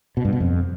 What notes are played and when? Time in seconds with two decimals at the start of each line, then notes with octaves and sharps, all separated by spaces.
0.17 B2
0.25 G2
0.32 B2
0.40 F2